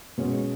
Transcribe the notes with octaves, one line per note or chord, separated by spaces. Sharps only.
B2 G#3 C#4